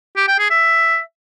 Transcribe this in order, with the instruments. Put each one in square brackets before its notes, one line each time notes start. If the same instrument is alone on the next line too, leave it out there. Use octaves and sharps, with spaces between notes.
[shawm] G4
G5
G#4
E5